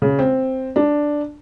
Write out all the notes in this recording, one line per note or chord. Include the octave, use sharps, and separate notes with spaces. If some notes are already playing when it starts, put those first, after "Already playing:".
C#3
C4
D4